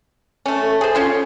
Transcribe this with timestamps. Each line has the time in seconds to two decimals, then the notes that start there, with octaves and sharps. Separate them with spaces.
0.46 A3 C#4
0.62 A4
0.81 G#4 C5
0.95 C#4 F4 C6